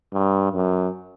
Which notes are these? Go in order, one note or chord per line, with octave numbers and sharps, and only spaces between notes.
G2
F#2